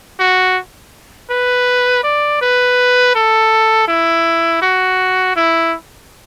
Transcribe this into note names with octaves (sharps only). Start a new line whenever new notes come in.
F#4
B4
D5
B4
A4
E4
F#4
E4